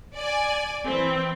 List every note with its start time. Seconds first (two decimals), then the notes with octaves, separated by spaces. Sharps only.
0.15 D5 G#5
0.85 E3 C4